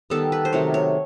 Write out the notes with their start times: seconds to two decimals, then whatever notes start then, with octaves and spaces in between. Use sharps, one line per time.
0.10 D#3 G3 B3 A4
0.32 B4
0.45 C5
0.53 C3 D#3 F#3 A3 C#5
0.74 C#5